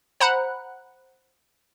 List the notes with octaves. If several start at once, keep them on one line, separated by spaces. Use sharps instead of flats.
C5 F#5 A#5 B5 F#6